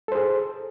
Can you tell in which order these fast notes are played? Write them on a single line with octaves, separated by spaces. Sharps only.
A4 C5 G#4